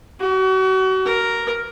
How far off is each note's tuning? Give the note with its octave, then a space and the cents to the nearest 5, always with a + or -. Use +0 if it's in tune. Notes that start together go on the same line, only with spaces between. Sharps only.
F#4 +35
A#4 +0